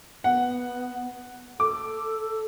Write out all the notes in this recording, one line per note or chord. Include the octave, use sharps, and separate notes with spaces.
B3 F#5
A4 D6